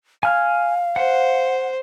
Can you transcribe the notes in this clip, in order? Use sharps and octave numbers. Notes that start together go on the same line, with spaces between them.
F5 G#5 F6
C5 F#5